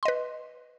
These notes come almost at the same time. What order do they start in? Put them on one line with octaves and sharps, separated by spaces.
C6 D#5 B4